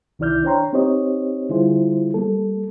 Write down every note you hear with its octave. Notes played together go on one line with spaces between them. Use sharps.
C2 D#3 E4 D5 F6 G6
D4 C5 C#5 G5 A#5 C6
C4 D#4 G4 C5 C#5 D#5
D3 G3 E4 F4 G#4 C5
G3 A#3 A4